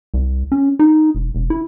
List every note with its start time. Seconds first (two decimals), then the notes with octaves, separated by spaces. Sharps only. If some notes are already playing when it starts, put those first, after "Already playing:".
0.14 C2
0.52 C#4
0.79 D#4
1.15 E1
1.35 E1
1.50 E4